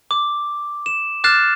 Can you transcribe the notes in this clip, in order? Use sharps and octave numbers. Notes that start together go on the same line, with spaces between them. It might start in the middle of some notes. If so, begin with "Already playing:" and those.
D6
E7
D6 F6 F#6 A6 C7 E7